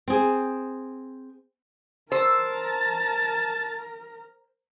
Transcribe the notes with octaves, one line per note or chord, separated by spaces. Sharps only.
C4 G#4
A#4 C5 A5 A#5 E6